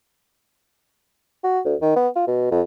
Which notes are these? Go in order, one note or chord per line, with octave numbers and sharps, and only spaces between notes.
F#4
D2
D#3
B3
F4
B2
F2